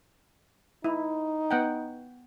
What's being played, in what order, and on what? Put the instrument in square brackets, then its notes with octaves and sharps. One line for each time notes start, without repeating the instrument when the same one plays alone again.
[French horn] D#4 [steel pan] E4
[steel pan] B3 F#5 G5